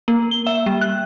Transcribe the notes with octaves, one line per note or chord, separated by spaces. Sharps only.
A#3
G7
E5
G3
F#6